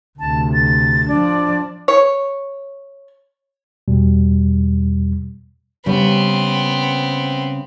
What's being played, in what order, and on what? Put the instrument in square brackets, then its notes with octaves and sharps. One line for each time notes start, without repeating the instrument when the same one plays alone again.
[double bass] D2 C3 [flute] A5
[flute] A6
[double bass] F3 D4 [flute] D5
[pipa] C#5
[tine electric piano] E2 B2 G3
[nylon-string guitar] C#3 G3 [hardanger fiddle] B3 C4